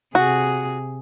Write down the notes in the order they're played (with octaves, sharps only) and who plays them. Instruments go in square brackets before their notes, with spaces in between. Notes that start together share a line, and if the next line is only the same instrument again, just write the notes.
[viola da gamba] C3 G#4 [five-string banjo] F#4